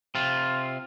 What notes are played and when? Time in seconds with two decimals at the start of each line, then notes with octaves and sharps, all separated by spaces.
0.15 C3 F4